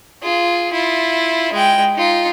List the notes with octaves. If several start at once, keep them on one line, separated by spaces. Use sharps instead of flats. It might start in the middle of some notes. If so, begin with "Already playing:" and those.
F4 G#4
E4 F4
G#3 G5
D#4 F4